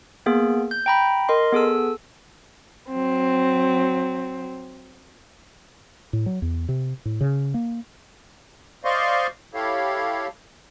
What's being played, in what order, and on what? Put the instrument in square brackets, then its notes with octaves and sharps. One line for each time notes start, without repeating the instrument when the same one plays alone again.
[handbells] A#3 B3 G#4
G6
G5 A#5 B5
A#4 D#5 C6
B3 G#4 A4 E6
[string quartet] F#3 C4
[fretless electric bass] A2
F#3
E2
C3
A2
C#3
A#3
[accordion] C5 D5 D#5 F5 C6 C#6
E4 G4 A4 C#5 F5